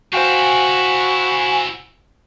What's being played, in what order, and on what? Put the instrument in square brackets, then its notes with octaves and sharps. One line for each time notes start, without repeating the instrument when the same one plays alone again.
[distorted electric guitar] C4 E4 [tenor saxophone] F#4 [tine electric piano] C5 F5 G5 [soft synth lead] G#5